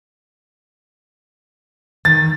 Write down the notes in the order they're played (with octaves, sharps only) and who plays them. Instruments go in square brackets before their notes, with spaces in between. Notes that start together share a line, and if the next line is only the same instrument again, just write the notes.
[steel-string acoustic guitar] D#3 [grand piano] A6